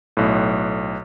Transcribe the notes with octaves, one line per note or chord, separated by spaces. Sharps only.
B1 A2